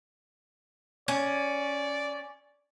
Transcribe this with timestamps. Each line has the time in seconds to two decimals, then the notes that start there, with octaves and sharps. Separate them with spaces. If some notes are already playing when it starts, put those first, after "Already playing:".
1.08 C#4 D5